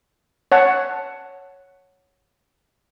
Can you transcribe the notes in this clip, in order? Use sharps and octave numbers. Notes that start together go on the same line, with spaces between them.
C#5 F#5 A5